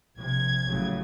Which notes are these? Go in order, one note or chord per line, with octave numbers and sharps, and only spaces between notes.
A#1 C3 G#6
A1 C#3 F#3